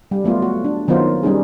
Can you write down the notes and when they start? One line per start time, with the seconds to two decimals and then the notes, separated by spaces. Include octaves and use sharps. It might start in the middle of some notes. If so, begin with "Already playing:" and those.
0.11 G3
0.24 F#3 A3 B3 F4
0.42 F#4
0.64 D4
0.88 D#3 F#3 B3 D#4 F4 C5
1.23 G3 C#4 D#4 G#4